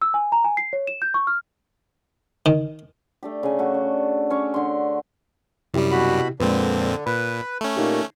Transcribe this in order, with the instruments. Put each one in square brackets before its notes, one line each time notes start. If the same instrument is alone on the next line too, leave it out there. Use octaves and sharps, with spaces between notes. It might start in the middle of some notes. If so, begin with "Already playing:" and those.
[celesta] E6
G#5
A#5
G#5
C7
C#5
E7
G6
C#6
F6
[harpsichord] D#3
[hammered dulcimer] A3 D4 G4
C#3 G#5
A3 F#4
D4
C#4 C#6 D6
D3 C6
[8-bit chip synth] F#2 G3 [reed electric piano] C3 E4 G4
[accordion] B2 F#4 B5
[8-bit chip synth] F2 A#2 C4 [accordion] D3 [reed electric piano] G#3 B4
[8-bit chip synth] A#2 [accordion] B4 [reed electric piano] B5
[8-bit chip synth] A3 C#4
[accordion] A#2 A#3 [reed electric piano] D#4 G4